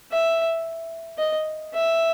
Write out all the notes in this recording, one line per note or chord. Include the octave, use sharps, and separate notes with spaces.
E5
D#5
E5